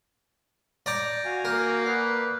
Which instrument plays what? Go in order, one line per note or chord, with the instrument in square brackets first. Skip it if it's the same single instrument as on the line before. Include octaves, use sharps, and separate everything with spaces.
[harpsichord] D5 A#5 D6 [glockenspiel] G6 A#6
[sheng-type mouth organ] F#4 F5 G#5
[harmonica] A#3 [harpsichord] A#4 [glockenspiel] F6 G6
[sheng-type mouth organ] B4 D5 [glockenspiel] D#6 F#6 C7